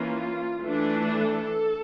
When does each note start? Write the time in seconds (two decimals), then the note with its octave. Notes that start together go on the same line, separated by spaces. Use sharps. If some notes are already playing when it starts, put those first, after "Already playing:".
Already playing: E3 A#3 C#4 F4
0.62 E3 A3 D4
1.14 A4